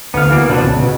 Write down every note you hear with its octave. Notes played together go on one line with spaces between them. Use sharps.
D2 B3 F5
E3 A#3 B3
B2 B3 C4 D4
C#2 C#3
B2